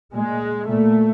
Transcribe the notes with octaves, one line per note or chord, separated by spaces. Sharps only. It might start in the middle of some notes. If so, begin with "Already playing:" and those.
A#2 G#3
A#2 A3